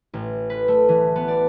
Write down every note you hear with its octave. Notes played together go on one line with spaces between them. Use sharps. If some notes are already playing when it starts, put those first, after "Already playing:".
A1
B4
A3
E3
B3
D5